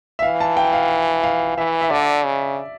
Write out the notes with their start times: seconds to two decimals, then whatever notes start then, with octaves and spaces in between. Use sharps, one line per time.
0.19 E5
0.22 E3 F5
0.40 A5
0.57 G5
0.73 F5
1.23 F5
1.57 E3 E5
1.81 E5
1.91 D3 D5
2.25 C#3